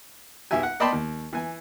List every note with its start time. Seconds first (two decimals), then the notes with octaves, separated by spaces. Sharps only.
0.51 B1 G4 E5 G#5
0.63 F#5
0.80 D5 D#5 G5 A5 B5 C6
0.93 D#2
1.33 E3 G#5